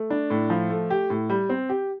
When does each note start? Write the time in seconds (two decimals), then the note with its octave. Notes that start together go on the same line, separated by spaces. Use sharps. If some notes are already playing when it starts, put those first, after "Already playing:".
Already playing: A3
0.10 D4
0.30 A2
0.50 F3
0.70 A3
0.90 G4
1.10 A2
1.30 G3
1.49 C4
1.69 G4